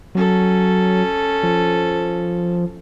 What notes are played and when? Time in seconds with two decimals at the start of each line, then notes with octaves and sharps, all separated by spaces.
0.15 F#3 C#4 A4
1.43 F3